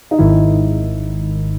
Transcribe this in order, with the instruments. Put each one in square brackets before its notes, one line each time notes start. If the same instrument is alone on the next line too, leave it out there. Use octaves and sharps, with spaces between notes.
[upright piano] D#4
[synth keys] G#1 G#2 D#3 [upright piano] E4